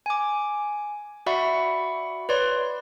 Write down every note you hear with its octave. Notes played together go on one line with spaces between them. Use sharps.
G#5 D6
F#4 D5 E5 F#5 B5 C#6
B4 C#5 D5 C6